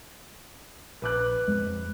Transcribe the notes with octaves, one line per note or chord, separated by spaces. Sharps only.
A#1 B4 D6 F#6
F2 G#3